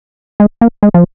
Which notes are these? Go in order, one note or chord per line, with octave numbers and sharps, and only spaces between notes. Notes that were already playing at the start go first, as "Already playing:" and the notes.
G#3
A#3
G#3
F3